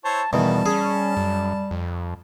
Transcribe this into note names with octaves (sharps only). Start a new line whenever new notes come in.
E4 C5 C#5 A5
E2 B2 D#3 G3 A5
C#4 G#4
F#2
F2